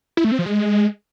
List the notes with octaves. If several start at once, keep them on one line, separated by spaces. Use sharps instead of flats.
E4
A3
C4
F3
G#3